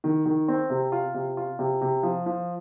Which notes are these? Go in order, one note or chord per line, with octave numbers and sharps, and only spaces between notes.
D#3
D#3
C4
C3
F4
C3
F4
C3
C3
F3
F3